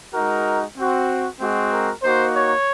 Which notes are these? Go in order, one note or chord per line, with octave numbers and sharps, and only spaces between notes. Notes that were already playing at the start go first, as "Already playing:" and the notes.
G#3 D#4 F#4 A#4
C4 F#4
G#3 C4 F#4
A#4
A#3 D#4 F#4 C5
C#5